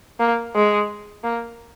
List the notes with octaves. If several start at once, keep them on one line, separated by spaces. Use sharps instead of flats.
A#3
G#3
A#3